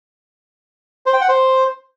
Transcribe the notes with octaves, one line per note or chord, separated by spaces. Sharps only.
C5
G5
F#5
C5